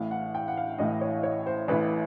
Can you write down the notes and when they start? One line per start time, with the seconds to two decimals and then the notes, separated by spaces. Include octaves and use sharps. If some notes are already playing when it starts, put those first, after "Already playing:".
Already playing: A1 A2 E3 F5
0.11 F#5
0.35 G5
0.48 F#5
0.57 F5
0.78 A1 A2 E3 D#5
1.01 C#5
1.23 C#5
1.46 C5
1.68 A1 A2 E3 B4